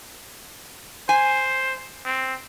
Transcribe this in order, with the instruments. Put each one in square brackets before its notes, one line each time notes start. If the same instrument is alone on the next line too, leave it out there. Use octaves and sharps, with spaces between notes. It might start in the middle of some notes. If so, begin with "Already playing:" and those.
[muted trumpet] C5 [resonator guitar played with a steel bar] G#5
[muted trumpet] C4